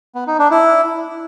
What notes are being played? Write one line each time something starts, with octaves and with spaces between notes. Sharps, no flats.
B3
D#4
D4
E4